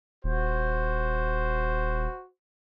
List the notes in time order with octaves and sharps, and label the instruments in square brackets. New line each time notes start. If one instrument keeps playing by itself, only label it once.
[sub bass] D#1 [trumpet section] F#4 C5